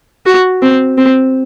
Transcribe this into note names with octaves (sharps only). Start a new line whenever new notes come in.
F#4
C4
C4